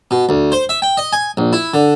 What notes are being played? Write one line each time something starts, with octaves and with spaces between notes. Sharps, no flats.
B2
D2
C5
E5
G5
D#5
G#5
A#1
E4
D3